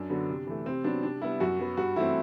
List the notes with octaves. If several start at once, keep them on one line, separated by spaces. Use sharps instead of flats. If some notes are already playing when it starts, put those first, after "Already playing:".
Already playing: F#2 D4
D3 F#3 B3
C3
E3 A3
C3 C4
F#3 B3 D4
C3 D4
G3 B3 E4
F#2 F#4
F#3 B3
G2 F#4
E3 A3 C4 E4